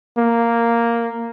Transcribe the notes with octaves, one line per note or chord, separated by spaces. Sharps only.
A#3